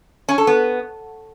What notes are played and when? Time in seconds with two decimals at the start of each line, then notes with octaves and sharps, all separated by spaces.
0.29 C#4
0.38 A4
0.47 B3